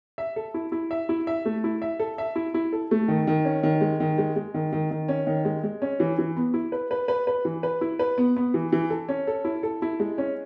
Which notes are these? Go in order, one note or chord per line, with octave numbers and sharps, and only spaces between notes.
E5
A4
E4
E4
E5
E4
E5
A3
E4
E5
A4
E5
E4
E4
A4
A3
D#3
D#3
C#4
D#3
G#3
D#3
G#3
G#3
D#3
D#3
D#3
C#4
D#3
G#3
G#3
C#4
E3
E3
B3
E4
B4
B4
B4
B4
E3
B4
E4
B4
B3
B3
E3
E3
A4
C#4
A4
E4
A4
E4
G#3
C#4